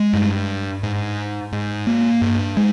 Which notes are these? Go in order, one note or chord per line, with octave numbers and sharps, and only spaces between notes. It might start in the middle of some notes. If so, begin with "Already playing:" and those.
Already playing: G#3
G2
G#2
G#2
A#3
G2
G#3